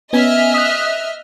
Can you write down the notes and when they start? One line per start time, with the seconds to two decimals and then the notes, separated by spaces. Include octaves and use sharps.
0.13 B3 C#4 D#5 E5 G#5 F6
0.54 D#6 F#6